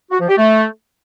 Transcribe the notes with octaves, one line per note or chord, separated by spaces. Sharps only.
F#4
F3
G4
A3